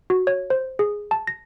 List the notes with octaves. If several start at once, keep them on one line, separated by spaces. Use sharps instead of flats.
F#4
C#5
C5
G#4
A5
A#6